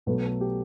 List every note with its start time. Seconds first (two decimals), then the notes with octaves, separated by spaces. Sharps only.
0.06 B1 B2 F#3 A3 B4
0.23 A4
0.41 G4